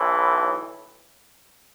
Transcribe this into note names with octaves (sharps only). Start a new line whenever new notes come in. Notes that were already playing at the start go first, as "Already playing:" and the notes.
Already playing: B1 A2 E3